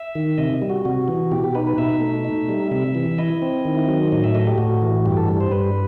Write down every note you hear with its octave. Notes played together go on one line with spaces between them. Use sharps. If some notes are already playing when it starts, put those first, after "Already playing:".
Already playing: E5
D#3
C3 D#5
G3
F#4
C3 F#4
E3
B2 G4
G4
D#4 B4
B4
B2 E5
A3
D#4
G3
C3 E5
E3
E4 D#5
C4
D#3
F#3
A2 D#5
E5
A3 D#5
G4
A2 F#4
E3
G2 G4
A4
G3
C5
G2 B4